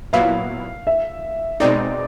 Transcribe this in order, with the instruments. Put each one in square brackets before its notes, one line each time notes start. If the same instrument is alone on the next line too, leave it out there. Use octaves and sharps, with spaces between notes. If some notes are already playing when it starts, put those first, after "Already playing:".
[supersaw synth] A#2 F#3 B3 E4 [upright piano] F5
[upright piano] E5
[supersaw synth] B2 G#3 C4 D#4 [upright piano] D5